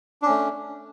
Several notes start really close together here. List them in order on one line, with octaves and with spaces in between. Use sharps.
D4 C#4 A3